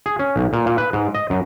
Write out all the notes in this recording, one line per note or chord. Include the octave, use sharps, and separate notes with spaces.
G#4
C#4
B1
A#2
A#2
B4
G#2
D#5
F#2